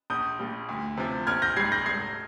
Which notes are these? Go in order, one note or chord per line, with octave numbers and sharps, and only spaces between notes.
A#1 D#6 G6
A#2 G3
D2
C3 F3
A#1 F6 G#6
G6 A#6
G#2 G3 G#6 C7
G6 A#6
F1 G#6 C7